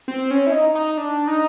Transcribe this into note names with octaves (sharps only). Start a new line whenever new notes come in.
C4
C#4
E4
D#4
D#4
D4
D#4